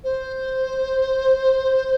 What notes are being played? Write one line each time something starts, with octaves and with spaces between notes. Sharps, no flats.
C5